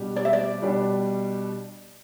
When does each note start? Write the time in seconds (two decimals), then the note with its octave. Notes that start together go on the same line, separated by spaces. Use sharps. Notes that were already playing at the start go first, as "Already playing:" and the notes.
Already playing: B2 G3 D4 G4
0.16 D5
0.25 E5
0.33 D5
0.62 B2 G3 D4 G4